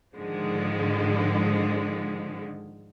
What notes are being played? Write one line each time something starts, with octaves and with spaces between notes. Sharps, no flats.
G#2 D3 D#3 F3 G#3